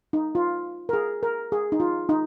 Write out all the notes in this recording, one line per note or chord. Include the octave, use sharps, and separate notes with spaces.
D#4
F4
A#4
G#4
A#4
G#4
D#4
F4
D#4